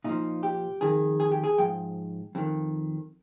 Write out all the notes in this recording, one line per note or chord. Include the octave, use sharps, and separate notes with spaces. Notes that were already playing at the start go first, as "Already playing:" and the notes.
A#2 F3 D#4
G4
F2 D#3 G#4
G#4
G4
G#4
G#2 F3 G5
F2 D#3